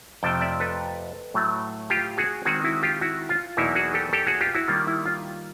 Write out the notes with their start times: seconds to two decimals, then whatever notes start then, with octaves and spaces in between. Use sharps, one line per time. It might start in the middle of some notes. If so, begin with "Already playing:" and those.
0.23 F2 C3 F3 A3 G5 A5
0.41 D5 E5
0.60 A4 B4
1.34 A2 F#3 A3
1.90 F4 G4
2.18 F#4 G#4
2.45 D#3 G#3 C4 F#4 G#4
2.64 E4 F#4
2.83 F4 G4
3.01 E4 F#4
3.29 F4
3.57 E2 B2 F#3 A#3 D#4 E4
3.75 F#4 G#4
3.94 G4 A4
4.13 G4 A4
4.27 F#4 G#4
4.41 F4 G4
4.55 E4 F#4
4.68 D#3 G3 A#3 F4
4.87 E4
5.06 F4